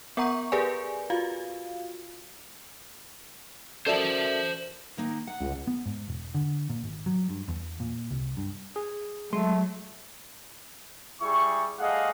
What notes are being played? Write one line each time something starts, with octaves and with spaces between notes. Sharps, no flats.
B3 A#4 F#5 A#5 C#6
G4 G#4 A#4 B4 D5 G#5
F4 F#4 F5
C#4 F#4 A4 A#4 C5 D5 E5 A5
D#3 A#3 D#4
F#5
C#2
B3
G#2
E1
D3
A#2
G#1
F#3
G2
E2
A#2
C2
G2
G#4
F#3 G#3 A3 C6
G3 E4 G#4 C#6
G3 A3 G#4 D#5 F5 F#5